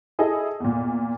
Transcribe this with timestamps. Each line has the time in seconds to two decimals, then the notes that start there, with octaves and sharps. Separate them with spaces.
0.19 E4 G#4 A4 D#5
0.60 E2 A#2